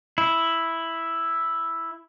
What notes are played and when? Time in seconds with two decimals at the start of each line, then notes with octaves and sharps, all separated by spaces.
0.18 E4